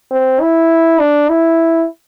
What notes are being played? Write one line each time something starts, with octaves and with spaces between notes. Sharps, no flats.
C4
E4
D4
E4